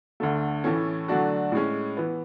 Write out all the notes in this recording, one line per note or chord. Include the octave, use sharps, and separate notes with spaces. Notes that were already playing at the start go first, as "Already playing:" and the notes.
D2 D3 A3
A2 E3 A3 C#4
D3 F#3 A3 D4 F#4
A2 G#3 C#4
E3 B3